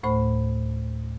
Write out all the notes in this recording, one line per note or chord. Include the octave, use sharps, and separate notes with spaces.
D2 A2 A3 C5 B5